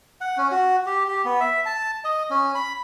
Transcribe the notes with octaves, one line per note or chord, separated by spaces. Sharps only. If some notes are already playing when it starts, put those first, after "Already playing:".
F#5
C#4
F#4
G4
G4
B3
E5
A5
D#5
C#4
B5